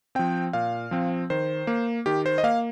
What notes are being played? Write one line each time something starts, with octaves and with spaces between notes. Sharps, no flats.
F3 C4 G5
A#2 F5
F3 C4
D#3 C5
A#3
D#3 G4
C5
D#5
A#3 F5